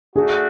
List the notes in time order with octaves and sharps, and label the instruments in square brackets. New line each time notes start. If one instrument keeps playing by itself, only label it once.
[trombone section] A3 D4 F#4 [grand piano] G#4